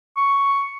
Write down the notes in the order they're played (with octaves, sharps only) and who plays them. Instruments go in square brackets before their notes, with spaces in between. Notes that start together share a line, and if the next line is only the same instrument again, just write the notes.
[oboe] C#6